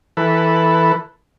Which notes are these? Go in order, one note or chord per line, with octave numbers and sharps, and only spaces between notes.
E3 A4 B4